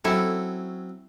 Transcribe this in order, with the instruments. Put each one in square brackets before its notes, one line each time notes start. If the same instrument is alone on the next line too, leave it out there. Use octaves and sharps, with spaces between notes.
[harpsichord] F#3 C4 C#4 [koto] E4 A4